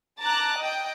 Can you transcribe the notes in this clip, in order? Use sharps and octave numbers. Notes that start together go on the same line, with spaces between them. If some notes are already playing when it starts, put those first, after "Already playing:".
A5 A#5 D6 F#6
D#5 G5